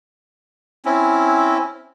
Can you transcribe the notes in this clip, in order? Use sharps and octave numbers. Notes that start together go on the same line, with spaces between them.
C4 C#4 E4